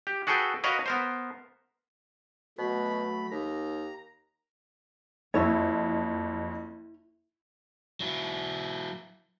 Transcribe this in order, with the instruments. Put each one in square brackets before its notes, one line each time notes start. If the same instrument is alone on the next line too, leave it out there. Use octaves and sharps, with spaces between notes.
[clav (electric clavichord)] G4
F#4 G#4 A4 B4 G5
F#4 A#4 B4 C#5 D#5 F5
B3 A#4 C5
[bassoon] B2 [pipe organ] F#3 A3 B5
[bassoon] D#2 [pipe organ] A#5
[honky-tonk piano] F#1 F2 [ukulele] E4 C#5
[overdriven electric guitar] F#3 E4